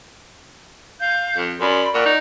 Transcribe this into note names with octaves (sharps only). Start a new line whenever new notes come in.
F5 G6
F2
F#2 D5 B5 C6
A#2 D5 F#5 C#6
D#4